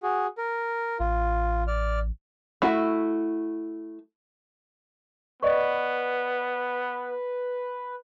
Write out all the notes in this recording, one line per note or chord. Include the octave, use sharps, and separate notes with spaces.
F#4 G#4
A#4
A1 F4
D5 F6
A3 E4 F#4
B3 B4 D5 D#5 C#6